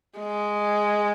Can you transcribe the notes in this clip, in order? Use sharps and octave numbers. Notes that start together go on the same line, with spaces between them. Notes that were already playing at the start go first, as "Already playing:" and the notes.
G#3